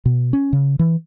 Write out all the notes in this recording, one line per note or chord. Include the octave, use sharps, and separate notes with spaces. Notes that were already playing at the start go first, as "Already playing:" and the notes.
B2
C#4
C#3
E3